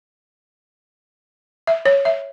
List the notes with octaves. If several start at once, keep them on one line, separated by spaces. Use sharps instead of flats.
E5
C#5
E5